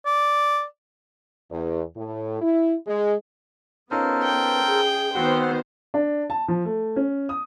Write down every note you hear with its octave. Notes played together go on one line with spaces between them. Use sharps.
D5
E2
A2
E4
G#3
B3 C#4 D#4 F4 A4 A#4 C5
G5
G#4
D#3 B3 C4 F#4 C5 F#5
D4
A5
F3
A3
C#4
D#6